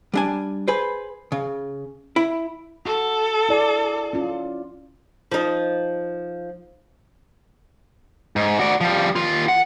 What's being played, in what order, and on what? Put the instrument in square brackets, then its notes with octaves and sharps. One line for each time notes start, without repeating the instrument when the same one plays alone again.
[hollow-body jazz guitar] G3 D4 G#5
G#4 B4 C5
C#3
E4
[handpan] F#4 [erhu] A4
[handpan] E4 D5
C#4 F4
[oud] F3 D#4
[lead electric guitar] G#2
F#4 D5
F3 G3
D#2 F4
F#5